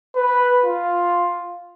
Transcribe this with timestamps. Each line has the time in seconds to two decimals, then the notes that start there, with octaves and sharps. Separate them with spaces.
0.15 B4
0.64 F4